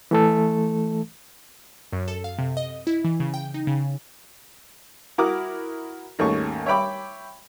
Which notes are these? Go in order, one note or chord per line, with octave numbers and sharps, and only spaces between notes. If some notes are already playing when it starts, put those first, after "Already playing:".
E3 A3 A4
F#2
A4
F5
C3
D#5
E4
E3
C#3
G5
D#4
C#3
E4 F#4 A#4 A#5 D6 D#6
G#1 D#2 A3 C#4 C#6
C#5 E5 G5 B5 D6